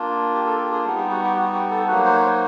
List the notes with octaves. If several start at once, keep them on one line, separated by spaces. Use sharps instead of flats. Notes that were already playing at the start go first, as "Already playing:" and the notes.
Already playing: A#3 D4 F4
G4
A4
G4
G#4
G3 B3 D#4 G#4
G4
F#4
G4
F#4
G4
A4
F#3 A#3 D#4 F#4 B4
C5
C#5
C5